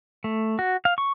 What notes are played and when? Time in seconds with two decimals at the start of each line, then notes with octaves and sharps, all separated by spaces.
0.24 A3
0.59 F#4
0.85 F5
0.98 C#6